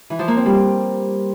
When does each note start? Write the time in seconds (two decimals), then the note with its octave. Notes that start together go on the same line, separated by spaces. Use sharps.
0.10 E3
0.19 F3
0.28 A#3
0.37 C4
0.46 G3